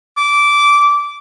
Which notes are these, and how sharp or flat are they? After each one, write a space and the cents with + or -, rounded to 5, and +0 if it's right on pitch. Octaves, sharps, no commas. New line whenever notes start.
D6 -15